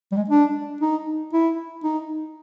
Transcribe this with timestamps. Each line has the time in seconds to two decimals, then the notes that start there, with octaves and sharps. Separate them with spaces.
0.12 G3
0.17 G#3
0.29 D4
0.81 D#4
1.33 E4
1.84 D#4